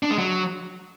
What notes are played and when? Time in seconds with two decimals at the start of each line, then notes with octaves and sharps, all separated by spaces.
0.03 D4
0.10 G#3
0.18 F#3